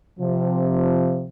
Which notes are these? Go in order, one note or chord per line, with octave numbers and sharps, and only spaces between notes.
C3 F3